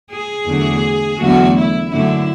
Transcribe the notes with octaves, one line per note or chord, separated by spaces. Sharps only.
G#4
E2 D3 F#3 A3
E2 D3 F#3 A3 F#4
E4
F#2 D3 A3 E4